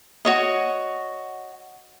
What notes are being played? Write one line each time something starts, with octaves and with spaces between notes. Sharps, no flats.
F#4 C#5 D#5